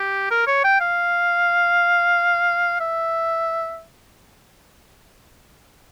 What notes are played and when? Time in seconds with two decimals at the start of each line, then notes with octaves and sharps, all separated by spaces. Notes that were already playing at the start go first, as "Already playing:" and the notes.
Already playing: G4
0.31 A#4
0.47 C#5
0.64 G5
0.80 F5
2.80 E5